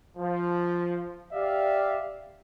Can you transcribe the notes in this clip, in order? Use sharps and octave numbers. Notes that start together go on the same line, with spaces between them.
F3
G4 D5 E5 F5